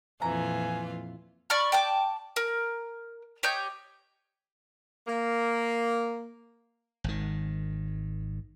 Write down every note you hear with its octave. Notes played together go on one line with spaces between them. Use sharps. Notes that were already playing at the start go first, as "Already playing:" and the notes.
F2 A#2 E3 F4 G#5 A#5
D5 B5 C#6 F6
G5 A5 D6
A#4
G4 C#5 D#5 G6
A#3
G#1 D#3